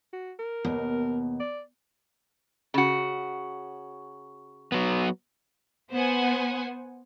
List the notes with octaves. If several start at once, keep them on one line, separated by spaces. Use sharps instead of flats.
F#4
A#4
D#2 B2
D5
C#3 F#4
F#3 B3
B3 C5 F#5 G#5